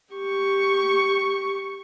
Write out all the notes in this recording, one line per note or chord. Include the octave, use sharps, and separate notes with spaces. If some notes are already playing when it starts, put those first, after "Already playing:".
G4 C#6